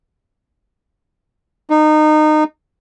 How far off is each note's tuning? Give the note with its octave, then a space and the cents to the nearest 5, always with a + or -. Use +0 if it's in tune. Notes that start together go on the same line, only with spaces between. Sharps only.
D#4 -25